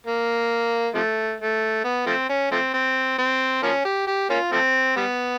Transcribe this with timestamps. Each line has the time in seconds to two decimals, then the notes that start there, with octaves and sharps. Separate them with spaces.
0.07 A#3
0.95 C3 F3 A3
1.41 A3
1.84 B3
2.06 F3 A3 C4
2.29 C#4
2.52 F3 A3 C4
2.74 C4
3.18 C4
3.63 F3 A#3 C#4
3.85 G4
4.07 G4
4.30 A#3 C#4 F4
4.52 F3 A3 C4
4.96 G3 B3